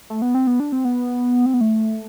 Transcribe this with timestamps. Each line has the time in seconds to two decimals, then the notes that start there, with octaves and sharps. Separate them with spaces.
0.10 A3
0.22 B3
0.35 C4
0.47 B3
0.60 D4
0.72 C4
0.85 B3
1.46 C4
1.54 B3
1.61 A3